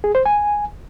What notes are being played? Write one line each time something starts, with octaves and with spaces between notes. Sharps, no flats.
G#4
C5
G#5